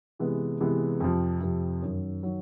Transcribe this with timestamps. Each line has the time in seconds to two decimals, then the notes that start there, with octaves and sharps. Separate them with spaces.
0.19 C3 E3 G#3 B3
0.60 C3 E3 G#3 B3
1.00 F2 C3 F3
1.41 F2 C3 F3
1.82 F#2 D#3 F#3
2.23 D#3 F#3